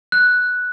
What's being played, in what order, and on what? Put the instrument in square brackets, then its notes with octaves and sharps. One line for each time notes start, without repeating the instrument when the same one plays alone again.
[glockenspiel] F#6